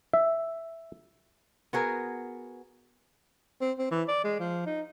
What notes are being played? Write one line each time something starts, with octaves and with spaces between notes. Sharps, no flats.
E5
B3 F#4 G#4 A#4
C4
C4
E3
D5
G#3
F3
D#4